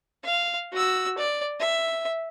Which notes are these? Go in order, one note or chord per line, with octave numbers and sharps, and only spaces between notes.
F5
F#4 E6
D5
E5